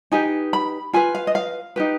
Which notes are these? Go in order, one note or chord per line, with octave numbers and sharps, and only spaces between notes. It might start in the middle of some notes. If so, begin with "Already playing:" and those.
D#4 G4 B4 G#5
B5
F4 B4 G#5
F5
D#5
F5
D#4 G4 B4